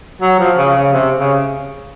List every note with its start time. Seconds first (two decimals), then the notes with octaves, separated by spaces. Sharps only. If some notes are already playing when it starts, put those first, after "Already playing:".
0.22 F#3
0.39 F3
0.57 C#3
0.75 C#3
0.93 C3
1.17 C#3